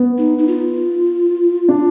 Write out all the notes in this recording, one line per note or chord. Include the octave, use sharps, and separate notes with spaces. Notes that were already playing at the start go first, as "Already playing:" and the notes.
Already playing: B3
D#4
D#4
F4
D4